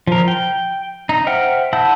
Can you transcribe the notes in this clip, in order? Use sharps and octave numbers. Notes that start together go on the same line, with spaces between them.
F3 A#4
G5
D#4
C5 E5 F#5 G5 F6
E4 F#5 A5 E6 G6